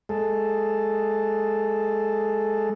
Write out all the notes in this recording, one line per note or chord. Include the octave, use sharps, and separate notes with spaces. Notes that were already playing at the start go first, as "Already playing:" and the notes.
G#3 A4